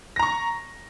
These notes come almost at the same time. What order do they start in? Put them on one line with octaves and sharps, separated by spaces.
A#6 A#5 C#6